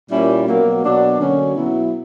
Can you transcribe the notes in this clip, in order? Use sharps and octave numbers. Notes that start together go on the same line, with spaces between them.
A#2 G3 A#3 C#4 E4
B2 F#3 A#3
B2 F#3 A#3 D4
D3 F#3 A#3 C#4 F#4
B2 F#3 B3 E4